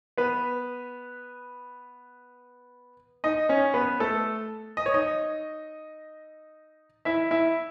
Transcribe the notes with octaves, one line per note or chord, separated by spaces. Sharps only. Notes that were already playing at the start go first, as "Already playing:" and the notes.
B3 B4
D#4 D#5
C#4 C#5
B3 B4
A3 A4
D#5
C#5
D#4 D#5
E4 E5
E4 E5